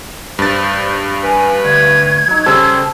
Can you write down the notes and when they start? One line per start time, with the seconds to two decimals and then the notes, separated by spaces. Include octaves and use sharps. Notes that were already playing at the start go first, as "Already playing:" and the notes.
0.39 G2 C5 A6
1.24 B4 G#5
1.65 D2 G#6
2.28 F#3 D#4
2.46 C#3 G3 A4 C5